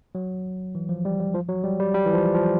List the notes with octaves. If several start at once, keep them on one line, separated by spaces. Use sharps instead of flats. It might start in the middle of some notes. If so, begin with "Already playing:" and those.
F#3
E3
F3
G3
G3
F3
F#3
G3
G3
G3
E3
F3
F3